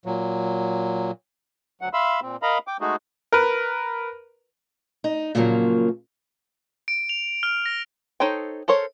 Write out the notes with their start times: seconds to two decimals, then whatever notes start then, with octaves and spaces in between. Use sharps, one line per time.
0.06 A#2 F#3
1.81 D2 F#3 F#5
1.93 E5 F5 B5 C6 E6
2.22 A#2 C4
2.42 A#4 D#5 F5 A#5 B5
2.67 G5 D6
2.81 G#3 A3 D#4 F#4 G#4
3.32 A#4 B4
5.04 D#4
5.35 A#2 C#3 F3 F#3 A#3
6.88 D7
7.09 F7
7.43 F6
7.66 A#6
8.20 D#4 A4 C5 C#5 G5
8.68 A4 A#4 C5 C#5